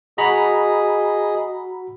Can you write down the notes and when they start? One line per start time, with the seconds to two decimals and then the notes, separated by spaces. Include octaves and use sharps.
0.18 F#4 G#4 D#5 A#5 B5